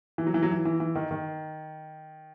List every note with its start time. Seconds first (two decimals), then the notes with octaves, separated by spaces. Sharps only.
0.18 E3
0.27 F#3
0.34 E3
0.43 F#3
0.52 E3
0.65 E3
0.80 E3
0.95 D#3
1.11 D#3